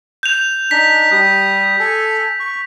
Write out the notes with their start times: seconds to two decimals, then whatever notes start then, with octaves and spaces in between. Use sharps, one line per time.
0.23 G6 F7
0.71 D4 D#4 B6
1.11 G3 D#6
1.80 A4 G#5
2.40 C#6